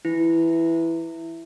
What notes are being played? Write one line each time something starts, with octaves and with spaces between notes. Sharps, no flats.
E3 E4